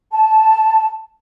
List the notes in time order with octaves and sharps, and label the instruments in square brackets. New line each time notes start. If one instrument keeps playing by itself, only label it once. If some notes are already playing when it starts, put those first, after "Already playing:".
[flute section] A5